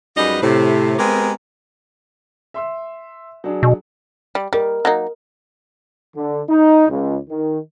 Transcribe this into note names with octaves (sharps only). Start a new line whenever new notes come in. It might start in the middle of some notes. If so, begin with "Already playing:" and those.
F#2 G3 G#3 D#4 B4 D#5
A2 C3
G#3 B3 C4 G4 A#4
E5 C6 E6
F#3 D4 G#4
B2
G3
G3 A#4 D#5
F#3 A#3 D#4
D3
D#4
C#2
D#3